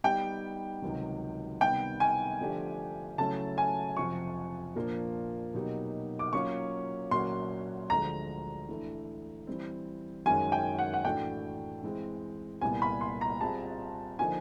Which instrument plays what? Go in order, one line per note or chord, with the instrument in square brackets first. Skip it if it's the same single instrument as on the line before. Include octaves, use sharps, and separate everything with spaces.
[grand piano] G3 B3 D#4 G4 [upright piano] G5
[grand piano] C#2 C3 D#3 F#3
[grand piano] C3 D#3 G3 B3 [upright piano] G5
[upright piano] G#5
[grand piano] D3 F3 A3 D4 G4
[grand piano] C#3 F#3 A3 C#4 E4 [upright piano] A5
[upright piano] G#5
[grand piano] F2 C3 F3 [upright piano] C#6
[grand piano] A#2 F3 A#3 D4 F4
B2 F#3 A#3 D#4 G4
[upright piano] D6
[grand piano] F#3 A#3 C#4 F4 [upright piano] C#6
[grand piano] A#2 F#3 A#3 C#4 F#4 [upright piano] C6
[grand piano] D2 D3 F3 G#3 [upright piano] A#5
[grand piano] E3 A3 D4
E3 G3 C4
[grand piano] F#2 D#3 G#3 C#4 [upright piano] G#5
[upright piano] G5
F#5
F#5
[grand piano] A2 E3 A3 D4 F#4 [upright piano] G5
[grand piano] E3 G#3 C4
[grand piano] C2 A#2 G3 B3 [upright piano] G#5
[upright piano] B5
C6
A#5
[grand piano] G3 C4 F4 G#4 [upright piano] A5
[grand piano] D3 F3 A#3 D#4 [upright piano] G#5